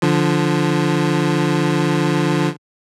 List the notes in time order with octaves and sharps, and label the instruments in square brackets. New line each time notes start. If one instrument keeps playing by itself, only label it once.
[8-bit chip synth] D3 F3